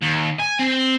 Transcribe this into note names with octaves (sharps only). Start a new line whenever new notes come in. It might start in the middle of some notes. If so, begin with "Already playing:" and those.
D#2
G#5
C4